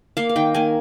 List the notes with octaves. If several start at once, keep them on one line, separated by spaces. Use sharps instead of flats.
A#3 F5
F5
D#3 G5
A#3 G#5